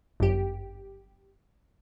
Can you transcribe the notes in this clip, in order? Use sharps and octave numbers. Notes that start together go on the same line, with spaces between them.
G1 F#2 G4